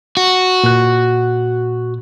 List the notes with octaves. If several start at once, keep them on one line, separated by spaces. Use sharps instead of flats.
F#4
A#2 F#6